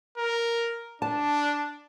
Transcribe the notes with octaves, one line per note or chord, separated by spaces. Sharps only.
A#4
D4 A5